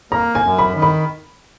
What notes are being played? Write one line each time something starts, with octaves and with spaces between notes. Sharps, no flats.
A#3 A#5
G#5
F#2
B5
D#3
B5